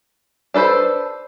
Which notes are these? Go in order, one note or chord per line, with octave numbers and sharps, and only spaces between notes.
D4 A4 B4 C5